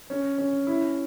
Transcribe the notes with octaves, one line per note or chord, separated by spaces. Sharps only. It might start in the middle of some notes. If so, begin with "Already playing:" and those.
C#4
C#4
E4